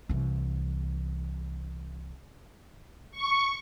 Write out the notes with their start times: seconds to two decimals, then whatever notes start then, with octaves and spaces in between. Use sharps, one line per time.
0.09 C2 E3
3.11 C#6